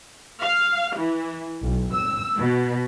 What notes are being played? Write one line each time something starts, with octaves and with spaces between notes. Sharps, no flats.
F5
E3
B1
E6
B2